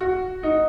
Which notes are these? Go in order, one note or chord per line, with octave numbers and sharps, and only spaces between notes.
F#4
D#4